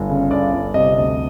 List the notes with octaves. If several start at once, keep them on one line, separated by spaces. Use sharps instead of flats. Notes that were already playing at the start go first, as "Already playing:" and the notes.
Already playing: G1
C#3
G1 D5
G1
C3 D#5
D2